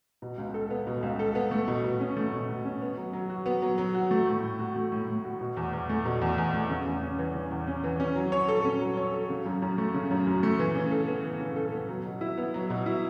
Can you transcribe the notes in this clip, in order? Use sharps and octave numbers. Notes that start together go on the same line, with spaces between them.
B2
C#2
A4
B3
B2
C#2
A4
B3
A3
B2
B2
C#4
A3
B2
B2
C#4
B3
F#3
F#3
F#4
B3
F#3
F#3
F#4
A3
A2
A2
F#4
A3
A2
A2
F#4
B2
E2
E2
A3
B2
E2
E2
A3
C#3
E2
C#4
E3
C#3
E2
C#4
E3
C#4
F#3
C#5
A4
C#4
F#3
C#5
A4
C#3
F#2
F#2
A3
C#3
F#2
F#2
A3
E3
C#3
A4
B3
E3
C#3
A4
B3
F#3
B2
E4
B3
F#3
B2
E4